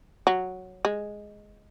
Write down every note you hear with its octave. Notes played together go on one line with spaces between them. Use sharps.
F#3
G#3